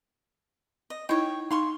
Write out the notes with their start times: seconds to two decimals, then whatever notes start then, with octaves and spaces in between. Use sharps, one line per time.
0.90 D#5
1.09 D#4 E4 C#5 D#5 G5
1.51 D#4 F5 C6 C#6